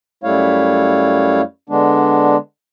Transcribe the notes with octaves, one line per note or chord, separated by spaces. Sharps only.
F#2 G3 A3 E4 C#5 F5
D3 G#3 B3 D4